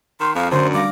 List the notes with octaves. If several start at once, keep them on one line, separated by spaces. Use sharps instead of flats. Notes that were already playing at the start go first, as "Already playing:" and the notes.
D#3 C6 E7
F2 F5
F#2 D3 A3 C5
G3 F5 D6 A#6